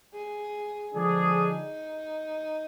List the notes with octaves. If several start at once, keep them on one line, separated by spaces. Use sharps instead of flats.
G#4
D3 F3 G#3 D4 G#4
D#4